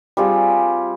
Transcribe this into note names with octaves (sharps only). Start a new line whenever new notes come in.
G3 C4 F4 G#4